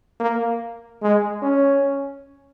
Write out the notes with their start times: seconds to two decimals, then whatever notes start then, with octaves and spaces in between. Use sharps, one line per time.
0.20 A#3
1.02 G#3
1.42 C#4